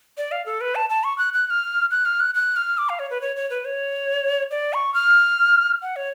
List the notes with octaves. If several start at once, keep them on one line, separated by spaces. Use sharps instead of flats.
D5
F5
A4
B4
A5
A5
C#6
F#6
F#6
F#6
F6
F#6
F6
F#6
F#6
F6
D6
F5
C#5
B4
C#5
C#5
B4
C#5
D5
C#6
F6
F#5
C#5